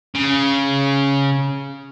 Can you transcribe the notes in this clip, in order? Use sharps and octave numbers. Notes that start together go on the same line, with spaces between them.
C#3